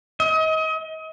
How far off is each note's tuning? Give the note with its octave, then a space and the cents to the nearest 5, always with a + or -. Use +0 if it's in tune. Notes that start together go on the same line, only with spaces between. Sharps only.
D#5 +35